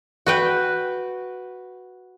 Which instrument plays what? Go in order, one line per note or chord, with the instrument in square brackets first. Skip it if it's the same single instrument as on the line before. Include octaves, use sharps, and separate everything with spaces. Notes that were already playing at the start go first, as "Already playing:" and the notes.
[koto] F#4 B4 G5